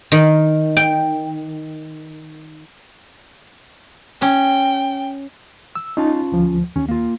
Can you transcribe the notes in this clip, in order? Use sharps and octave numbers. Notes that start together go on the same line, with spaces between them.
D#3
G5
C#4 G5
E6
C#4 D#4 F4 A5
D2 F3
D#2 C#4
A#3 F4